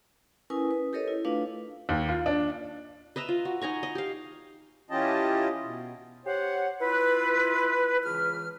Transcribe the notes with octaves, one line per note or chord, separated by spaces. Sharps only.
C#4 E4 A#4 B4 G#5 D#6
B4
G4 A4 A#4 C#5 D#5
E4
A3 D4 F4 B4 F5
D#2
F4
D4
B4 D#5 E5 A#5
F4
F#4
D#4 G#5 A#5 C#6
D#5
G4 F5
E3 C#4 F4 G4 D#5 A5
B2
G4 C5 C#5 F#5
E4 F4 B4
C#2 E3 F6